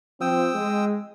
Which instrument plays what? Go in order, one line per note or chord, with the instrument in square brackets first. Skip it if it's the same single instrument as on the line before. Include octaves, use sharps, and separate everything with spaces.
[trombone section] F3 C4 [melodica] G5 D#6 E6
[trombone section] G#3